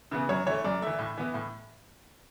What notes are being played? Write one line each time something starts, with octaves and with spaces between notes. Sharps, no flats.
C#3 E3 B3
F#2 C#5
E3 A3 C#5
F#2 D5
E3 A3 E5
A2
E3 B3
A2